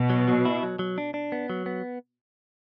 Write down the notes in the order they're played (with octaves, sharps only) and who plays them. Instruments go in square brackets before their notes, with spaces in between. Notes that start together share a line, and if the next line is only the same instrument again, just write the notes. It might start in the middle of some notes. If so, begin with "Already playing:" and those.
Already playing: [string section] B2
[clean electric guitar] F#3
F#3
E4
F#3
F#3
D4
D4
B3
F#3
B3